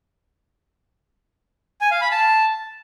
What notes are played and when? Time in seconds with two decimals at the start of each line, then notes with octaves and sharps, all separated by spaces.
1.81 G#5
1.91 F5
2.01 B5
2.11 A5